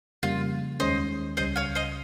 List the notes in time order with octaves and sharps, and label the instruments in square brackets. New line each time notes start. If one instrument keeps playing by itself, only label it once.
[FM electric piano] F2 C#3 G3 A#3 [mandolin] F4
[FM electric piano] D#2 D#3 G#3 C#4 [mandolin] C5 D#5
[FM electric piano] C#2 C#3 G3 C#4 [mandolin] C5 D#5
[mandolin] C#5 F5
C5 D#5